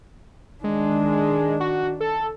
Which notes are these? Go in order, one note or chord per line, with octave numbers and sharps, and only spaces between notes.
D#3 G#3 D4
F#4
A4